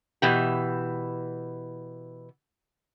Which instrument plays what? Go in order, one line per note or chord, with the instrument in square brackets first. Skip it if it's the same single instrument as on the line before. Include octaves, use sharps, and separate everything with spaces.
[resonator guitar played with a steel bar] B2 E3 G4